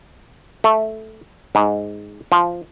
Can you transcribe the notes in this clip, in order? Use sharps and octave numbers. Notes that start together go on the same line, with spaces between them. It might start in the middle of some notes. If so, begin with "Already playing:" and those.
A3
G#2
F3